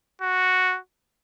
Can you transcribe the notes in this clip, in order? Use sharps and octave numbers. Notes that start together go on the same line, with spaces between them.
F#4